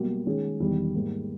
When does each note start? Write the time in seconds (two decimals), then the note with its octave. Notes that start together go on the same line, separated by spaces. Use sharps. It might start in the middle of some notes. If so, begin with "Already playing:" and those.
Already playing: B1 B2 G3 A#3
0.26 D#3 G#3 C#4 G#4
0.60 E1 E2 D#3 G3
0.94 G#2 G3 A#3